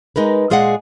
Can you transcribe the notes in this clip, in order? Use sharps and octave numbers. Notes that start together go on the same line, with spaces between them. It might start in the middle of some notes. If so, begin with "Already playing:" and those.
G#3 D#4 A#4 B4
A#2 G#3 G#4 D5 F5 F#5